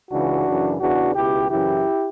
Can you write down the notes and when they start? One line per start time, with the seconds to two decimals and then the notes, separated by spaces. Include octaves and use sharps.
0.11 C#2 C#3 E3 D4 F#4
0.47 F#2 C#3 E3
0.81 E2 C#3 E3 D4 F#4
1.16 C#2 B2 E4 G4
1.50 F#2 C#3 E3 E4 G4